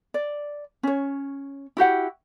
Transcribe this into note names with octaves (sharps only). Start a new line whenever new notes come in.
D5
C#4 C#5
E4 F#4 G4 F#5